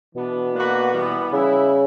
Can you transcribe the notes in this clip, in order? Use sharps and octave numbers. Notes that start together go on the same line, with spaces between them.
B2 E3 B3 D4
A#3 D4 F#4 B4
E3 G3 B3
C#3 G3 B3 E4